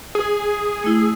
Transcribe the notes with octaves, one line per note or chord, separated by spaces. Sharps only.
G#4
A3 E4